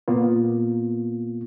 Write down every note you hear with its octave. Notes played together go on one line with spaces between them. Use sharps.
A#2 A#3 B3 F4